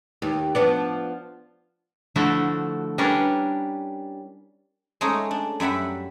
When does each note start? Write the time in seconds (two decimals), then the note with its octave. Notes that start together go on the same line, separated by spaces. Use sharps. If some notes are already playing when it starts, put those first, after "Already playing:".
0.22 D#2
0.55 F3 B3 D4
2.16 D3 F3 A3 E4 F#4
2.98 G3 C#4 D4 A#4 B4 C#5
5.01 G#3 A3 C#4 D#4
5.31 D4
5.60 F#2 G3 E5 F#5 B5